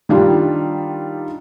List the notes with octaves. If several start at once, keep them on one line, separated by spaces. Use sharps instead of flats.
D#3 G3 D4 F4